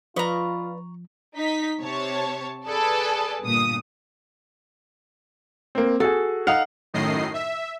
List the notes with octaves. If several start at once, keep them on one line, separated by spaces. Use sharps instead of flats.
F3 F4 B4 D5 D#5 A#5 C#6
D#4 B6
C3 C#5 A5
G#4 A4 B4 D5 A5
G1 A#2 D#6
A#3 C4
F#4 G#4 A4
D#4 F5 F#5
F#2 A2 D#3 D#5 C7
E5